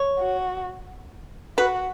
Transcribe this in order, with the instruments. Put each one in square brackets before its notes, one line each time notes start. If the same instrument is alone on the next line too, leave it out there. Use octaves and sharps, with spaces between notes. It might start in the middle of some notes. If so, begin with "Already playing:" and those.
Already playing: [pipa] C#5
[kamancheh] F#4
[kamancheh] F#4 [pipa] B4